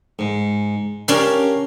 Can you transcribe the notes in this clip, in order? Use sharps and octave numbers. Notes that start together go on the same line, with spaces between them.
G#2
C#4 D4 G4 A#4 F5